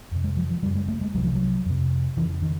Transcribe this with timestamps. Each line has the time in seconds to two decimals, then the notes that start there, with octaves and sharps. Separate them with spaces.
0.11 F2 C3
0.24 G#3
0.37 F3
0.50 F3
0.63 F#2 C#3 G3
0.75 G#3
0.88 A3
1.01 G#3
1.14 C2 C3 F#3
1.24 F3
1.35 F#3
1.66 F2 C3
2.17 F2 C#3 E3
2.42 D#3